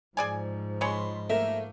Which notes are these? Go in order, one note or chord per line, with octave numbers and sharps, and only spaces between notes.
G#2 F3 G#4 D5 G#5
G#3 G#4 C#5 B5 C6
A3 A#3 A#4 E5